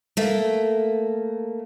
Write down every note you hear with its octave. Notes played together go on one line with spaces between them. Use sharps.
A3 A#3